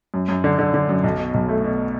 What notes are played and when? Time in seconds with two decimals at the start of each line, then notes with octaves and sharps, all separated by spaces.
0.14 F#2
0.29 F#2
0.44 D3
0.59 D3
0.74 D3
0.89 F#2
1.04 B1
1.19 B2
1.34 B1
1.49 A3
1.64 B2